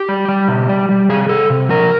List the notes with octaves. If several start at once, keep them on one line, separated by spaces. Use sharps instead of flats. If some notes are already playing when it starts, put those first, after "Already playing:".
Already playing: G4
G3
G3
B2
G3
G3
C3 G#4
C3 A4
C3
F3 A#4